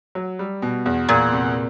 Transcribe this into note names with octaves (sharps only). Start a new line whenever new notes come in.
F#3
G3
B2
E2
E2 A#2
C3